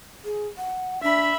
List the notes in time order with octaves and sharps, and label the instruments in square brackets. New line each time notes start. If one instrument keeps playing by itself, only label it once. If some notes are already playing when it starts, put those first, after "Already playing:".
[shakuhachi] G#4
F#5
[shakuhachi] D4 [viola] E5 B5